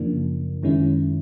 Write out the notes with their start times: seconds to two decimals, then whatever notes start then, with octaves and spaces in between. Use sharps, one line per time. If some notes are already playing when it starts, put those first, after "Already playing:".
Already playing: F#2 C#3 F3 A#3 D4
0.63 F#2 D#3 G#3 C#4 E4